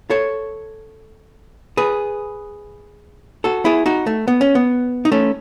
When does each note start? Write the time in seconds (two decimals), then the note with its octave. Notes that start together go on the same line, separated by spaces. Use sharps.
0.10 A4 C#5
1.77 G#4 B4
3.44 F#4 A4
3.65 E4 G#4
3.86 D#4 F#4
4.07 A3
4.28 B3
4.41 C#4
4.55 B3
5.05 D#4
5.12 A3 C#4